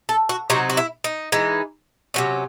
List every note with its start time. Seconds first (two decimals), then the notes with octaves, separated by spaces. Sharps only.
0.09 A4
0.29 F#4
0.50 C3 F#3 C4 D#4 F#4
0.70 F#4
0.77 E4
1.04 D#4
1.32 E3 G#3 D#4
2.14 C3 F#3 C#4